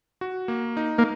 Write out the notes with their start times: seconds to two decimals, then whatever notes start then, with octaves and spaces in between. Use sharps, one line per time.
0.21 F#4
0.48 A#3
0.77 D#4
0.98 A#3